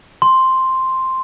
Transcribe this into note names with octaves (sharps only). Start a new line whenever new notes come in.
C6